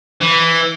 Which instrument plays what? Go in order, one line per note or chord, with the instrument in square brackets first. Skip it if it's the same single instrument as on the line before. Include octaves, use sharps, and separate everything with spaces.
[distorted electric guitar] E3